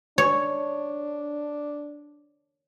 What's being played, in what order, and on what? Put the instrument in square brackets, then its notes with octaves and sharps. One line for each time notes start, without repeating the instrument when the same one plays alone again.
[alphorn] D4 [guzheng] C#5